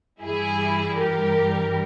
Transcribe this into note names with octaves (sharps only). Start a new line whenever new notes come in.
G2 E3 G3 E4 G#4
G4 A#4